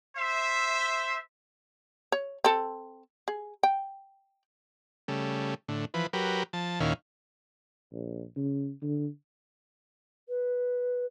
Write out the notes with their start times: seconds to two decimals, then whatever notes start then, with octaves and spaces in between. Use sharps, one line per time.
0.16 C5 E5
2.12 C#5
2.44 C4 A4
3.28 G#4
3.63 G5
5.08 C#3 G3 A3
5.68 A2 D3
5.94 E3 F3 B4
6.13 F#3 G4 A#4 B4
6.53 F3 A5
6.80 D#2 A#2 D#3 C#4 E4 F5
7.92 A#1
8.36 C#3
8.82 D3
10.28 B4